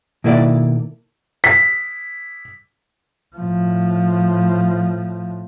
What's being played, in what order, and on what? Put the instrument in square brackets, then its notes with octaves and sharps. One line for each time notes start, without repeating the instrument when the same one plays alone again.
[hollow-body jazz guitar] B2 D#3 A#3 E4 A4 D5
[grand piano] B6
[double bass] A2 F3